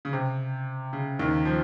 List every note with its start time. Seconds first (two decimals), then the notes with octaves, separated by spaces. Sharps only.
0.05 C#3
0.13 C3
0.93 C#3
1.19 D#2 D#3
1.45 F3